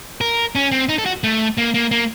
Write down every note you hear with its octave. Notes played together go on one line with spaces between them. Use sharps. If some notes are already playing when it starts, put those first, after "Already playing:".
A#4
C#4
C4
D#4
A4
F#4
A3
A#3
A#3
A#3